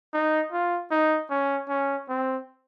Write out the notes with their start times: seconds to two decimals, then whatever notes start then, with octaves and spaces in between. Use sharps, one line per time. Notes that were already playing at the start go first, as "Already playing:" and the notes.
0.14 D#4
0.52 F4
0.91 D#4
1.30 C#4
1.69 C#4
2.09 C4